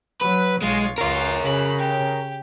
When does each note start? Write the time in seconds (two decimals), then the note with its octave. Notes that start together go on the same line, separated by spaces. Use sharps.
0.21 F#3 B4
0.62 B1 G#3 F4 C#5
0.98 C#2 F4 A#4 C#5
1.44 C#3 B5
1.79 G4